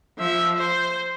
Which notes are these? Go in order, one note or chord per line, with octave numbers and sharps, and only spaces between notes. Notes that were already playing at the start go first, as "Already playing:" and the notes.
F3 E5
C5